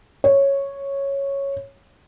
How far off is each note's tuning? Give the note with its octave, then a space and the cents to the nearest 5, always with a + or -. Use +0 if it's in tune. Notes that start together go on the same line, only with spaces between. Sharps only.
C#5 -5